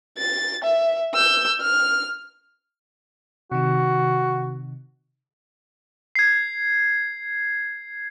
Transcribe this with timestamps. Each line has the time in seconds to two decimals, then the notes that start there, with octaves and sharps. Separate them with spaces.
0.18 A6
0.64 E5
1.14 E6 G6
1.61 F6
3.52 C3 D#3 F#4
6.15 G#6 C7